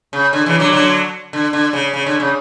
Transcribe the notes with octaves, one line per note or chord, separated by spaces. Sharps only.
C#3
D3
C#3 E3
D3 F#3
D3 F#3
D3
D3
C#3
C#3
D3
C#3